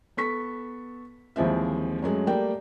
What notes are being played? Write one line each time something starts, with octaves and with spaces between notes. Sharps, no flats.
B3 A4 C#6 B6
D#2 E3 F3 G#3 C4 E5
F#2 F#3 G#3 A3
G3 A3 A#3 D5 G5